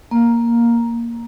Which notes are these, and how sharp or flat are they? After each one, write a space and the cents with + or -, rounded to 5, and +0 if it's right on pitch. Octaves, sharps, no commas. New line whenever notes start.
A#3 +5